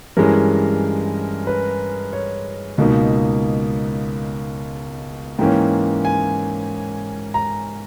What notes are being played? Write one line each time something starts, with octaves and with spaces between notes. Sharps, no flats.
G2 E3 G#3 C#4 A#4
B4
C#5
C#2 B2 A#3 D#4
G#2 E3 A#3 C#4 G5
G#5
A#5